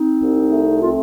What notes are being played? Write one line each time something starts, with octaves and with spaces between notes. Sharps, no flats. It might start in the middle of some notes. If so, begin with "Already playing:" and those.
Already playing: C4 D#4
C2
A3
C4 F4